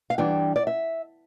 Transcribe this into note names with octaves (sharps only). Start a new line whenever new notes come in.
F5
E3 G3 D4 G5
D5
E5